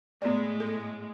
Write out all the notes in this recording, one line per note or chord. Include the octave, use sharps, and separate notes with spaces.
A2 G#3 B3 D5
A4